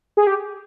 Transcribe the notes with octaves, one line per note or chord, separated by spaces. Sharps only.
G#4
G4